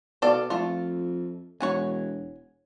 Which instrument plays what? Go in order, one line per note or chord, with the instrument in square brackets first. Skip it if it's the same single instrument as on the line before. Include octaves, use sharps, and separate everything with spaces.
[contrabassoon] B2 [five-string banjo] A4 D5 F5
[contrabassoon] F2 [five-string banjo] A3 F4
[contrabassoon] E1 [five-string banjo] C#5 F#5 G#5